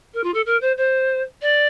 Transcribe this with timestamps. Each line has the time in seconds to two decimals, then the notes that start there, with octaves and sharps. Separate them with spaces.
0.14 A#4
0.24 F4
0.34 A4
0.46 A#4
0.61 C5
0.77 C5
1.42 D5